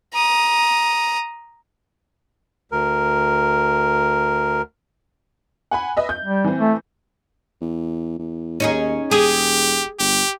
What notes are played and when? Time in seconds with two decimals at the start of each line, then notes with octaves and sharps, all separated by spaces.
0.14 A#5 D#6
2.72 D2 A#4
5.71 F#5 G#5 B5
5.97 B4 D#5 E5
6.09 G6
6.25 G3
6.44 E3 C4
6.59 A3
7.61 E2
8.18 E2
8.60 D#2 C#4 D#4 G#4
9.11 E1 G4 G#4
9.99 G1 G4